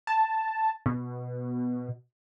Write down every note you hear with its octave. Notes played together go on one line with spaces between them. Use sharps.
A5
B2